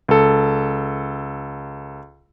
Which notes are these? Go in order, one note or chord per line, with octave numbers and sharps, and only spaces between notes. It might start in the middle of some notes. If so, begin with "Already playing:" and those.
C#2 A4